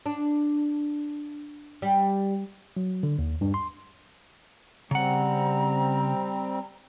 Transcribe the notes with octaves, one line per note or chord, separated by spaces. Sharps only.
D4
G3
F#3
D3
D#2
G2
C6
C#3 G3 C4 F#5 A#5